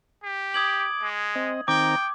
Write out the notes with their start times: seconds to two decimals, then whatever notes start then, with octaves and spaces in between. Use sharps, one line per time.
0.23 G4
0.54 D6 D#6 G#6 F#7
1.02 G#3
1.35 C4 D#5
1.68 D#3 C4 G5 A#5 D6